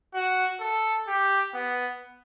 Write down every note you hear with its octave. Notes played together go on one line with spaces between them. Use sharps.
F#4
A4
G4
B3